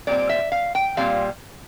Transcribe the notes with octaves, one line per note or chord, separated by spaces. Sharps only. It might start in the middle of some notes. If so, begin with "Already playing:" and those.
A#2 G3 C4 D5
E5
F5
G5
A#2 G3 C4 F5